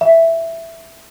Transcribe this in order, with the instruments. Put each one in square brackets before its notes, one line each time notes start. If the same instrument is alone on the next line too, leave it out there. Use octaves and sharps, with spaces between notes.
[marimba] E5